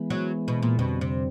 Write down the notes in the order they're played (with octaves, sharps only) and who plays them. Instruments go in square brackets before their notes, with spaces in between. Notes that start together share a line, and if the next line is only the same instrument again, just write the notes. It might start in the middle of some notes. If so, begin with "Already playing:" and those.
Already playing: [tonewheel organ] E3 G#3 B3
[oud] F#3
B2
A#2
[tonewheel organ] F2 D3 G3 C4 [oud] B2
[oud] C3